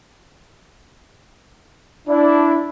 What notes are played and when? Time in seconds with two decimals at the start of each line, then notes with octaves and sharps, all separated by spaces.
2.07 D4 E4